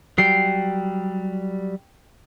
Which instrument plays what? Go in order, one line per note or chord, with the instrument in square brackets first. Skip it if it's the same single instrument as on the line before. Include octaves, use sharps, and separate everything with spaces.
[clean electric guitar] F#3 G3 [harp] G5 C7